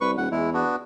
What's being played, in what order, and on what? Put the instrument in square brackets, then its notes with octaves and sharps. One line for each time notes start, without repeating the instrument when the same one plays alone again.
[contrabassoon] C2 [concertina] B4 C#6
[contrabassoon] D#1 [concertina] F#5
[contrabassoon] E2 [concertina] G#3 E4
[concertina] B3 D4 F#4